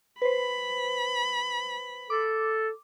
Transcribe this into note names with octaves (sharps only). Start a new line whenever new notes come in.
B4 C5 B5
A4 D6